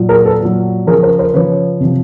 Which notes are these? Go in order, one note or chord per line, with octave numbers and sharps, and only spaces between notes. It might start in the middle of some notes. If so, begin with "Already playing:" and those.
Already playing: A#2 F#3
G#4 A#4
A4 B4
A#2 F#3
C#3 F3 G#4 A#4
A#4 C5
A#4 C5
C#3 F3 B4 C#5
C3 F3